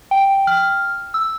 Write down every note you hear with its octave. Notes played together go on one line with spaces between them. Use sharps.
G5
F6
E6